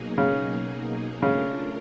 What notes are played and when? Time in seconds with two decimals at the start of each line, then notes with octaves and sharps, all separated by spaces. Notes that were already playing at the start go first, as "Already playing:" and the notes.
Already playing: B2 F#3 A#3 D#4 G#4
0.18 C#3
1.22 C#3 A3 D4 F4 A#4